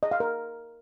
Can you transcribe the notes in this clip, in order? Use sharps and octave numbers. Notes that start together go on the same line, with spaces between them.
D#5
F5
A#4